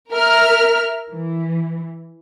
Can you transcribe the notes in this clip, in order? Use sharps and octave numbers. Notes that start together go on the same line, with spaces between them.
A#4 E5 F6
E3